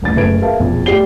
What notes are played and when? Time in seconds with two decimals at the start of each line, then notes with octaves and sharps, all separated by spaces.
0.01 D#1 A1 A6
0.16 F#1 A3 B4 G#6 D7
0.42 G#4 A#4 B4 E5 F5 A5
0.59 E1 A#1 F2
0.86 A3 G4 D5 C7 G7